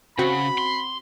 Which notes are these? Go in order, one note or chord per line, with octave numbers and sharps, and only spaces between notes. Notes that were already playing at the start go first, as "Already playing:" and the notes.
C#3 C4 F#4 B5
C6